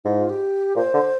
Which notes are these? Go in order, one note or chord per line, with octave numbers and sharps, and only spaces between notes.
G#2 E4
F4
G4
A#2 C5
D3